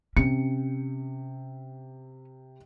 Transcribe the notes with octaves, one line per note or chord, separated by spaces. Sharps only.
C3 C#4 C#7